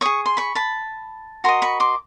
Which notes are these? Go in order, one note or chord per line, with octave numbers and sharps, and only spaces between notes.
G#4 C#5 C#6 D#6
C6
B5 C#6
A5 B5
F#4 A#4 D#5 A#5 C6
B5 C#6
C6 D6